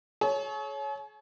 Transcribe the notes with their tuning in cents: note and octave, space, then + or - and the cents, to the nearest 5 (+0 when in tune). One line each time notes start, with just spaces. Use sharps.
G#4 +45 C#5 +0